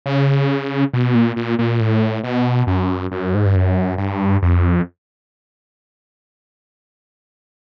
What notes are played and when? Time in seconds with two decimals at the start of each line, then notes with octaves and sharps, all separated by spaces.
0.06 C#3
0.93 B2
1.15 A#2
1.36 A#2
1.59 A#2
1.80 A2
2.24 B2
2.67 F#2
3.12 F#2
3.35 G#2
3.45 G2
3.55 F#2
3.98 G2
4.42 F2